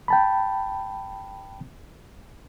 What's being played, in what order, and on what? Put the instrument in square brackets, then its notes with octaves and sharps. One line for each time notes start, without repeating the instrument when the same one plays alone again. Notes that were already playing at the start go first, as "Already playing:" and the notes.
[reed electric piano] G5 A5 B5